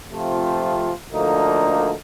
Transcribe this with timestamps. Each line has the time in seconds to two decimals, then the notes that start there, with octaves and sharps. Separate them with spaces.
0.11 C3 F3 A3 C4 F4
1.11 D2 D3 F3 A#3 D#4